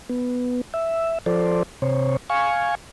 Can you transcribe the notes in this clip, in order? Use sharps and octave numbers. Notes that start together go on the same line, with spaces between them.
B3
E5
F3 A4 C5 D5
C3 C5 C#5
F5 G#5 C#6